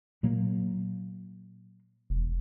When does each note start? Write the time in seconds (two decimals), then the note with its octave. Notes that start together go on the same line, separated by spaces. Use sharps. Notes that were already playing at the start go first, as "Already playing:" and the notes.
0.23 A#2 F#3 A#3
2.10 E1